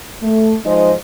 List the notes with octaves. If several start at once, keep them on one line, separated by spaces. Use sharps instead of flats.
A3
F3 G#3 D#4 C5 D#5